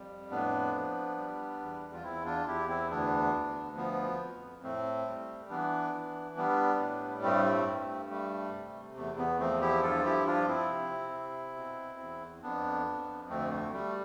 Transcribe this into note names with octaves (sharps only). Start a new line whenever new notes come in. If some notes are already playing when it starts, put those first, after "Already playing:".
Already playing: F2 G3
A2 B3 D4
F3
G3
E2
F4
E2 C4 E4
D4 F4
E2 E4 G4
C4 E4
D2 B3 D4
D2
F3 B3
F2
A2 A3 C4
G3
E3 B3 D4
E3
G3 B3 D4
A2
G2 A3 C4
G2
G3 A3
C3
E2 A3
B3
F3 A3 C4
E4 G4
G2 F4 A4
E4 G4
F3 D4 F4
C4 E4
C3
C3
B2
E2
F2 B3 D4
F2
D2 A3 C4
A3
G3 A3